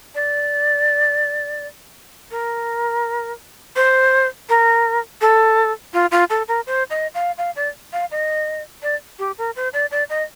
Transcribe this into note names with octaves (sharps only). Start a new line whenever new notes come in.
D5
A#4
C5
A#4
A4
F4
F4
A4
A#4
C5
D#5
F5
F5
D5
F5
D#5
D5
G4
A#4
C5
D5
D5
D#5